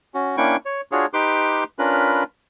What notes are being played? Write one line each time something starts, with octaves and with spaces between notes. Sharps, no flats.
C#4 F#4
A#3 C#4 D4 E4 G5 C#6
C#5
D4 F4 F#4 G#4 C#5
D#4 G4 B4 C6 D6
C#4 D4 F4 A#4 B4 B5